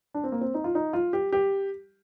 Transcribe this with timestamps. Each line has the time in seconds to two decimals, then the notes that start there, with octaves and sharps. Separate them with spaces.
0.14 D4
0.24 C4
0.32 A#3
0.41 C4
0.54 D#4
0.64 F4
0.75 D#4
0.93 F4
1.13 G4
1.32 G4